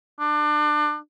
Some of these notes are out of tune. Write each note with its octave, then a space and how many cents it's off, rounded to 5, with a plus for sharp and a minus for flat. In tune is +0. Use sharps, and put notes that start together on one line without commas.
D4 +30